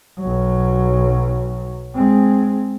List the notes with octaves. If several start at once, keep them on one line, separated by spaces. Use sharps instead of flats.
B1 F#3
G#3 C4